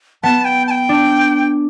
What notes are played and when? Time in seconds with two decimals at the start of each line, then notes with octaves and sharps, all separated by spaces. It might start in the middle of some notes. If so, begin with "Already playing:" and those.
0.23 B3 A5
0.45 G5
0.67 A5
0.71 G5
0.89 D4